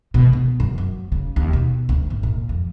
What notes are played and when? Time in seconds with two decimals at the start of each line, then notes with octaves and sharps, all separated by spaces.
0.14 B2
0.33 B2
0.60 F#2
0.78 F#3
1.12 C#3
1.36 D#2
1.53 B2
1.89 D2
2.10 G#1
2.23 A#2
2.49 F2